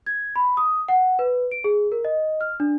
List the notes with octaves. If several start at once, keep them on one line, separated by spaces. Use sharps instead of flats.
G#6
B5
D#6
F#5
B4
D7
G#4
A#4
D#5
F6
D4